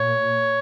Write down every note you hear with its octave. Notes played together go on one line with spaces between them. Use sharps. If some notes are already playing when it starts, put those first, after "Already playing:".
Already playing: A#2 C#5